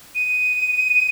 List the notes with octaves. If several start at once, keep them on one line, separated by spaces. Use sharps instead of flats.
D#7